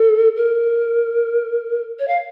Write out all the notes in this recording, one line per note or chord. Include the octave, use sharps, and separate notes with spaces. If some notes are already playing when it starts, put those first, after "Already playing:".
Already playing: A4
A#4
C#5
F5